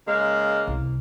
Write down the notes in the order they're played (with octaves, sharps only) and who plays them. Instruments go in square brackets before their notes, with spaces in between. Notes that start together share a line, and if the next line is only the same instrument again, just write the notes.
[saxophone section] C#3 G#3 A#3
[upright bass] C2